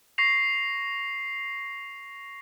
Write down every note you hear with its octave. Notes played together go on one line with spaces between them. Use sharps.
C#6 A#6 C7 F7